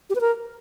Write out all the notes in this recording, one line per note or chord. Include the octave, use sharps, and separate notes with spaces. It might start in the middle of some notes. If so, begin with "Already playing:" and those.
G4
B4
A#4